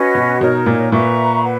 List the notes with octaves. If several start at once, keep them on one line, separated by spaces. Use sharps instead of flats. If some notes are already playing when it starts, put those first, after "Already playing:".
Already playing: C#4 F#4 B4 D#5
B2
B2 D#4 A#4 C#5
A#2
A#2 B4 E5 A#5 C#6
B4 F#5